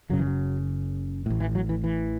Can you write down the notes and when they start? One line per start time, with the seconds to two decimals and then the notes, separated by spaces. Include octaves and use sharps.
0.09 F#1 F#2 C#3 F#3
0.19 E3
0.27 F#3
1.26 A1 A2
1.40 E3
1.55 F#3
1.69 E3
1.84 E3